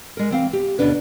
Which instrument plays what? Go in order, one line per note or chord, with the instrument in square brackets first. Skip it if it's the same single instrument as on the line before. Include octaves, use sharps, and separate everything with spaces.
[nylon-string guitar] G#3 A#4
E3 C4 F5
G4
D2 B2 C#4 D4 B4